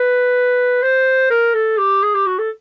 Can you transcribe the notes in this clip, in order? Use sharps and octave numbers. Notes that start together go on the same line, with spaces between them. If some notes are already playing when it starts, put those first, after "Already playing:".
Already playing: B4
C5
A#4
A4
G4
G#4
G4
F#4
A4